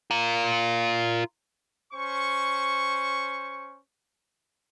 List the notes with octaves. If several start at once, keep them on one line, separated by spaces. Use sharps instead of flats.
F4 A#4
C#4 C5 C#6